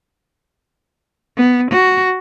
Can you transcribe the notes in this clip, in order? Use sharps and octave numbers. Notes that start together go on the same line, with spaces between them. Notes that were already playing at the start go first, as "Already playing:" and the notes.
B3
F#4